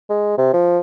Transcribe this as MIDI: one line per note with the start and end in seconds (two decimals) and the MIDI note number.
0.10 0.35 56
0.38 0.49 48
0.53 0.79 53